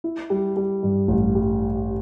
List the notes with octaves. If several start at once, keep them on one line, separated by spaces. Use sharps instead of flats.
E4
G3
G3
G2
A1
G3